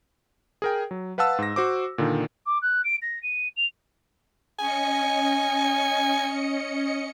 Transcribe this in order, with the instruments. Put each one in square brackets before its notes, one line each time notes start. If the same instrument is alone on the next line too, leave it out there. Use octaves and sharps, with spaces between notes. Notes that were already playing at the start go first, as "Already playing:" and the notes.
[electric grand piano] G#4 A#4 G5
F#3
B4 F5 F#5 A5 E6
G#2 A#6
F#4 C5 D6
A#2 D3 D#3
[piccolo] D6
F#6
D7
A#6
D#7
F7
[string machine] C#4 D#5 C#7 [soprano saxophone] G#5